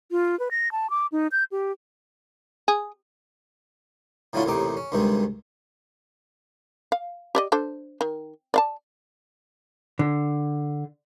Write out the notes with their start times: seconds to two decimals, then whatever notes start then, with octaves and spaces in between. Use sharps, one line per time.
0.11 F4
0.39 B4
0.51 A#6
0.72 A5
0.90 D6
1.12 D#4
1.32 G6
1.52 G4
2.68 G#4
4.33 A2 D3 F#3 C#4 E4 F4
4.46 A1 D#2 A2 C3 D#4 D6
4.77 C#4
4.92 D2 G2 C3 D#3 G#3
6.92 F5
7.35 G4 D5 D#5
7.52 D4 A4 C5
8.01 D#3
8.54 D5 F5 A5
9.99 D3